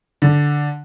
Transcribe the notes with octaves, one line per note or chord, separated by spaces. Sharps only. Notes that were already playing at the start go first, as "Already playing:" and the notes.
D3